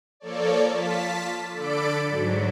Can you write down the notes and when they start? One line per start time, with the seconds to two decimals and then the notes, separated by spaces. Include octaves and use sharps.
0.20 F3 A#3 A4 C#5 D5
0.68 F4 A5 B6
1.53 D3 A4 D5 B5 D7
2.09 G#2 F#3